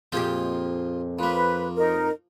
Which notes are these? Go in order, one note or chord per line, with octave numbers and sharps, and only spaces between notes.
F2 A#2 F4 G4 G#4 G5
F3 A#3 B4 B5
D#4 A#4